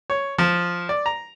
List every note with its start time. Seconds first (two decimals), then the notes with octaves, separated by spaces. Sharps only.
0.10 C#5
0.38 F3
0.89 D5
1.06 A#5